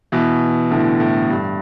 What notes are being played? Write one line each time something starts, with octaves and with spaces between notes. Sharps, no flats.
B2 E3
A2 D3
A2
G2